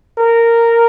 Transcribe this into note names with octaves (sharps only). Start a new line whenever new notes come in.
A#4